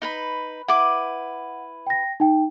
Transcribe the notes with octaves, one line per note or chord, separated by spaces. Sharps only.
D#4 B4 B5
E4 B4 F#5 D6
G5 A#6
D#4 G5